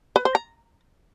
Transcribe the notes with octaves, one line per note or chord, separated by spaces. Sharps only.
B4
C5
A#5